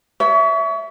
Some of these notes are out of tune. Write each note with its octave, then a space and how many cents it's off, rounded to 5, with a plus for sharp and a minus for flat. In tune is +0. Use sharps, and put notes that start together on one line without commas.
C#5 +35 E5 +0